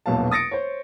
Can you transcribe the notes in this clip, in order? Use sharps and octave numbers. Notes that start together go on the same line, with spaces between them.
E1 A#1 B2 F#3 F5 A5
D#6 A6 A#6 C#7 D7
C5 C#5